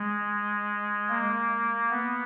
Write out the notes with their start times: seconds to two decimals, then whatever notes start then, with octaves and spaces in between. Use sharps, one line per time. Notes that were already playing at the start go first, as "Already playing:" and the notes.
Already playing: G#3
1.10 A#3
1.90 B3